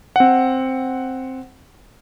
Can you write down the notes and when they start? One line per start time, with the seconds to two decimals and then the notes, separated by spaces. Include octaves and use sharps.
0.16 C4 F#5